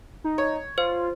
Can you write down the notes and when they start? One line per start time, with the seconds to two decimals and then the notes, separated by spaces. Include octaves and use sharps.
0.24 D#4
0.38 C#5
0.78 F4 C5